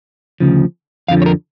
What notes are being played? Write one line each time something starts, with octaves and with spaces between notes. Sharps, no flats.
D2 C#3 F3
F2 D3 F3 F5
C#5
A#4